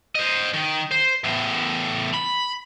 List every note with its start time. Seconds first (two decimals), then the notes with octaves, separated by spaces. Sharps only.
0.15 C5 D#5
0.54 D#3
0.91 C5
1.24 E2 A2
2.13 B5